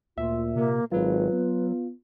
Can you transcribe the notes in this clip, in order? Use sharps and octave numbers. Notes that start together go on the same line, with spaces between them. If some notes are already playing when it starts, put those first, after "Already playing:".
D2 A#2 F4 E5
C3 A#3
G#1 F#3 F4 B4
B3